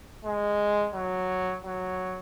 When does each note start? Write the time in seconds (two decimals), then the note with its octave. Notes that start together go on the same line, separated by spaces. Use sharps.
0.25 G#3
0.94 F#3
1.64 F#3